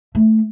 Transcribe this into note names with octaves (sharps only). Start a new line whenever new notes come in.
A3